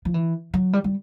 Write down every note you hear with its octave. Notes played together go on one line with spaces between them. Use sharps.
F3
E3
F#3
G3
G3